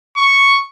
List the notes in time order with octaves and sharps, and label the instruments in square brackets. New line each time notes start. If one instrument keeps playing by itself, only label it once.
[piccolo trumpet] C#6